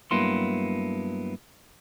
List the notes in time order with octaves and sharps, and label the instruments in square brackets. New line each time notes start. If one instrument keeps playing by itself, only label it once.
[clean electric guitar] G2 F#3 A#3 B3 E4 C6